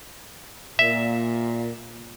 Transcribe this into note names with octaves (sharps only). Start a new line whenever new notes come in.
A#2 E5